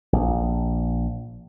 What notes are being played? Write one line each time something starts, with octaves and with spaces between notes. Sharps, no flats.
A#1